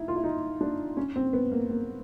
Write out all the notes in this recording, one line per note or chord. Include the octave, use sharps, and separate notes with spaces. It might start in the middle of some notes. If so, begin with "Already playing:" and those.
Already playing: D#4 E4
F4
E4
D#4
D4
C#4
C4
B3
A#3
A#3